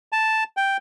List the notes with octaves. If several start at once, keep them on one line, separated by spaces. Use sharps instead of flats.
A5
G5